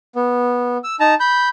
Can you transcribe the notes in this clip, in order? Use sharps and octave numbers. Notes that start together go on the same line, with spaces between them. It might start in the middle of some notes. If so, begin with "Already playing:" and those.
B3
E6
D#4 A5 A#5
B5 G6